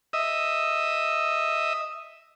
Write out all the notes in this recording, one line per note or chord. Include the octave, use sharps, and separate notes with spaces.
D#5 E5